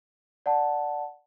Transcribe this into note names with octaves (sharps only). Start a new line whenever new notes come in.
D5 F#5 A5